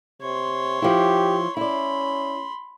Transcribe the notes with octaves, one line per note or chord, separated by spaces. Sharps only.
C3 C#5 C6
F3 E4 G4
C#4 E4 D5 B5 C6